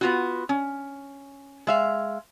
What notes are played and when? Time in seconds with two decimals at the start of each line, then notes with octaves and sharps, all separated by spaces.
0.01 B3 F4 F#4
0.49 C#4
1.67 G#3 E5 F5